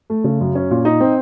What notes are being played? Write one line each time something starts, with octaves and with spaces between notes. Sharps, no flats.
A3
C#3
F#2
C#4
A#2
D#4
C4